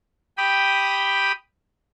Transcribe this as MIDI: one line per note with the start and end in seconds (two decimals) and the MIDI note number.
0.37 1.32 67
0.37 1.32 79
0.37 1.32 83
0.37 1.32 87